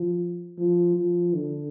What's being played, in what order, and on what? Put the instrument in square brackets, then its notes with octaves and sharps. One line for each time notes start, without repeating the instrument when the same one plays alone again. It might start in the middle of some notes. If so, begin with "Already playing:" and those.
Already playing: [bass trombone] F3
F3
F3
D3